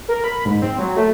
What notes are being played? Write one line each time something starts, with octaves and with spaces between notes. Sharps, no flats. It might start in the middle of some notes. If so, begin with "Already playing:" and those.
A#4
B5
G#2
C4
F#3
A3